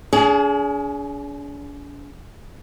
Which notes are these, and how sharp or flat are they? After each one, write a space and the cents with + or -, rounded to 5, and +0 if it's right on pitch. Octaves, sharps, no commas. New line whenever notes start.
D4 -45 G#4 +15